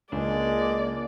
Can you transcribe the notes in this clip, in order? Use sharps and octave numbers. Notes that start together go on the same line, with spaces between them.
C#2 G#3 A#3 D4 D5